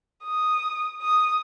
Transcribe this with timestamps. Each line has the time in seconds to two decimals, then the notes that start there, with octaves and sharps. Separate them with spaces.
0.24 D#6
1.02 D#6